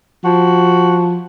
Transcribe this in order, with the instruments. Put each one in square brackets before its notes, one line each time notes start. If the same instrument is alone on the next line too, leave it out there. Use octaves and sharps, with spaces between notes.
[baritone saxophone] F3 [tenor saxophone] F#4